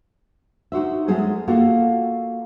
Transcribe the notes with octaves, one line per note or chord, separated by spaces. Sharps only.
D#4 F#4 C5 E5
F#3 G#3 A3 C#4 G#4 C5
A#3 F4 F#4 A4